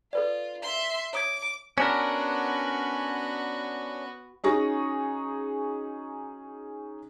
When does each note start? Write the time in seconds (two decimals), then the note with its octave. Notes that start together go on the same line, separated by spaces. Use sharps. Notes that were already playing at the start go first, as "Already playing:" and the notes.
0.13 F4 A4 B4 D5
0.63 E5 C6
1.13 C#5 D6 D#6 G#6
1.78 B3 C#4 D4 F#4 A#4
4.44 C#4 D#4 F#4 G#4 C#6 A#6